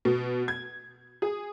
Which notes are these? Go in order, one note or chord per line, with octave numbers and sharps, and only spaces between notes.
B2
G#6
G#4